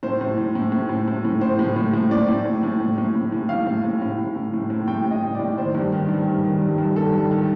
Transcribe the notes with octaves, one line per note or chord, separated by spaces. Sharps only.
A2 C5
A2
A2
A2
A2
A2
A2
A2
A2 C5
A2
A2
A2
A2 D5
A2
A2
A2
A2
A2
A2
A2
A2 F5
A2
A2
A2
A2
A2
A2
A2
A2 G5
A2
D#5
A2
D5
A2
D#3 C5
G2
D#3
G2
G2
D#3
G2
G2
D#3 A4
G2
D#3